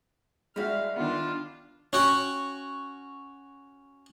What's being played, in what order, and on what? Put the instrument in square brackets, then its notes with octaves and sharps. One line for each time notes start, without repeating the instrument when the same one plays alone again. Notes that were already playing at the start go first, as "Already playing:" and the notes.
[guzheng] G3 E4 [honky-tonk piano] G#3 F#4 B6 [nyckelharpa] F5
[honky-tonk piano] D#3 B3 [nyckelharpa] D4 F4
[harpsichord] C#4 F#4 F#5 G5